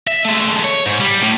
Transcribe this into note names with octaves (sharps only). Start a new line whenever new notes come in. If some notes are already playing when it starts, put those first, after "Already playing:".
E5
G#3 A3
C#5
G#2
G3
A2